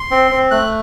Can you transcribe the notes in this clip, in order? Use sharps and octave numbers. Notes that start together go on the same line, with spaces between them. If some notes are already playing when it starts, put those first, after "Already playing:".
Already playing: C6
C4
C4
A3 F#6